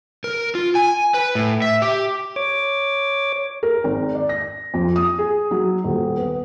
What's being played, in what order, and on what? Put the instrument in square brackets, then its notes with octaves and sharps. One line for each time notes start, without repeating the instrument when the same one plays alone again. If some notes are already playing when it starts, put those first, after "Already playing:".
[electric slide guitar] A#4
F4
G#5
B4
A2
E5
G4
[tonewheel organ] C#5 D6
[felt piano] A#4
G#1
D5
A#6
F2
D#6
G#4
F#3
D#1
B3